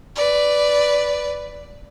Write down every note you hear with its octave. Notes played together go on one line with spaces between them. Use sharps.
B4 D5